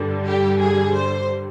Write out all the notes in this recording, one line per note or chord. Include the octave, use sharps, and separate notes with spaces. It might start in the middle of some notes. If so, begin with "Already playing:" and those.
Already playing: G2 D3 G3
G4
G#4
C5